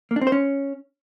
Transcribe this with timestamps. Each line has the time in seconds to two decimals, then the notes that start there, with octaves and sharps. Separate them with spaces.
0.11 A#3
0.16 D4
0.21 C4
0.27 C5
0.32 C#4